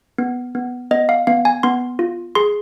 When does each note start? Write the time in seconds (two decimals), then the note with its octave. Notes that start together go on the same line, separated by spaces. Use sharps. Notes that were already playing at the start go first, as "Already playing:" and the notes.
0.18 B3
0.55 B3
0.91 B3 D#5
1.09 F5
1.27 B3 F5
1.45 G#5
1.63 B3 C6
1.99 F4
2.35 G#4 C6